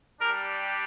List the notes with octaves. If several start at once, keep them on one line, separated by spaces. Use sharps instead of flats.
G3 D4 G4 A#4